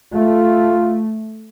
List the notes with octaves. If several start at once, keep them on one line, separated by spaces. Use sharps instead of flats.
A3 F4